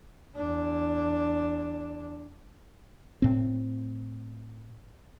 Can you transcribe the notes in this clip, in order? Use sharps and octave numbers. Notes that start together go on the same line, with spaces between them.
E2 D4
A2 C4